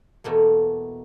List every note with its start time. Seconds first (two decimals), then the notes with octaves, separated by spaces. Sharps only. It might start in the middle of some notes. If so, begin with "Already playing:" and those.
0.24 E2 B2 A3 A#3